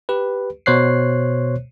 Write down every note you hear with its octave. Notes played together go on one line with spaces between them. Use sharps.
G4 B4
B2 C5 C#5 F#6 C7